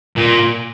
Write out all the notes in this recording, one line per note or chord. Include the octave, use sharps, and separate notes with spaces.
A#2